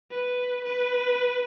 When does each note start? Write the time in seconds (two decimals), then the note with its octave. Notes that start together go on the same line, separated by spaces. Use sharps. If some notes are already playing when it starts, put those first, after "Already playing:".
0.11 B4
0.64 B4